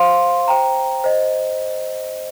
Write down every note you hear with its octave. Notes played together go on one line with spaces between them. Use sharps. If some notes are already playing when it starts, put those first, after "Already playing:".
Already playing: C5 F5 C6
C5 G5 A#5
C5 D#5